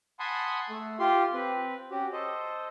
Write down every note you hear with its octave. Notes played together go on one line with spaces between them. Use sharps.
F#5 G#5 A5 B5 C6 D#6
A3
F4 G4 C6
C4 B4
C#4 F#4 G4
A4 C5 D#5